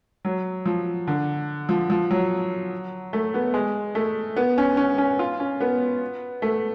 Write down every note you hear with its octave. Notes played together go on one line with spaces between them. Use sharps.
F#3
F3
D3
F3
F3
F#3
A3
B3
G#3
A3
B3
C#4
C#4
C#4
F4
C#4
B3
A3